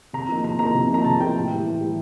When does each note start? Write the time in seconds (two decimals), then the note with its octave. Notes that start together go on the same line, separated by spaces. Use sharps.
0.13 C3 A#5
0.29 F3 A#3 D#4
0.44 C3 A#5
0.59 F3 A#3 D#4 A#5
0.74 C3
0.89 F3 A#3 D#4 A#5
1.04 C3 A5
1.19 F3 A#3 D#4 G5
1.35 A2
1.50 E3 G3
1.65 A2
1.80 E3 G3